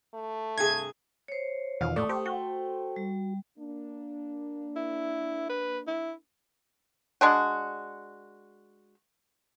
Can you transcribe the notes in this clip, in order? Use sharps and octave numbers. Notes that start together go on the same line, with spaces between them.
A3
G2 C3 G#4 G#6
C5 C#5
E2 B2 D#3 F4 F5
A2 A3 D5 D#6
G4 A4 C5
F#4 G5
G3
A#3 D4
E4
B4
E4
G#3 D4 F#4